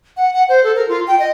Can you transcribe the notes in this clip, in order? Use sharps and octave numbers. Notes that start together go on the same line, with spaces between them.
F#5
F#5
C5
A4
A#4
F4
G5
D#5